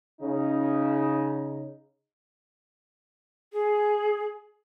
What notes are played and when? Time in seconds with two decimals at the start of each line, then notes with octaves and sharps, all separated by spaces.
0.21 C#3 D#4
3.53 G#4